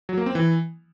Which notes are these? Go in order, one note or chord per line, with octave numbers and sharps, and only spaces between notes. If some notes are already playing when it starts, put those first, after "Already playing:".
F#3
A#3
C4
E3